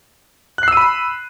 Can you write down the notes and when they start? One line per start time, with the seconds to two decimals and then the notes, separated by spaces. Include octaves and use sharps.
0.58 F#6
0.63 C7
0.68 E6
0.72 D#7
0.77 B5